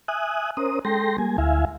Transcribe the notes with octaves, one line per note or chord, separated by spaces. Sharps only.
E5 G#5 D#6 F#6
C#4 A#4 C5 D#6
G#3 A4 G5 C6 A#6
G3 A#3 G#5
D2 E4 E5 F5 G#5